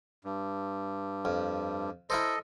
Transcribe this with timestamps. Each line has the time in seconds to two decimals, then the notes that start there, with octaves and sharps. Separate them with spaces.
0.25 G2
1.25 F2
2.10 E4 A4 A#4 C5 D#5